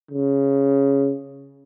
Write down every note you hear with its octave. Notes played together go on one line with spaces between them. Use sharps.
C#3